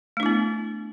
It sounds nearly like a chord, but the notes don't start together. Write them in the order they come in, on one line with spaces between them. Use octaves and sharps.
A3 D4 E4 B3